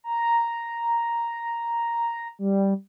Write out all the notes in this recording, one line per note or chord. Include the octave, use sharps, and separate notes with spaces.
A#5
G3